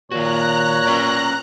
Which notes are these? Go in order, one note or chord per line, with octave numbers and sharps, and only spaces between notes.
A#2 D#3 F#4 C#5 A#5 F#6
C#4 B4 D5